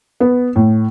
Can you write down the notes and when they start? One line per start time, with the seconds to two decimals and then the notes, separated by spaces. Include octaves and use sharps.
0.20 B3
0.56 A2